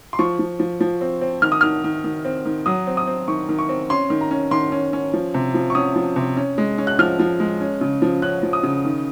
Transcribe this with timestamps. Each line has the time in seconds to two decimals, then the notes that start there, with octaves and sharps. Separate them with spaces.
0.13 C6
0.19 F3 C#6
0.39 F3
0.60 F3
0.81 F3
1.01 C4
1.22 C4
1.42 D#3 F6
1.52 D#6
1.61 D#3 F6
1.84 D#3
2.04 D#3
2.25 C4
2.45 D#3
2.66 F#3 D#6
2.87 C4
2.97 D#6
3.07 C4
3.28 D#3 C#6
3.49 D#3
3.59 C#6
3.69 C4
3.90 C#4 C6
4.10 D#3
4.21 A#5
4.31 C#4
4.51 D#3 C6
4.72 C#4
4.93 C#4
5.13 F3
5.34 C3
5.54 F3
5.70 C#6
5.75 C#4 D#6
5.96 F3
6.16 C3
6.37 C#4
6.58 G#3
6.78 C#4
6.87 F#6
6.99 F3 F6
7.19 F3
7.40 G#3
7.61 C#4
7.81 C#3
8.02 F3
8.22 C#4 F#6
8.43 F3
8.53 D#6
8.63 C#3
8.85 D#3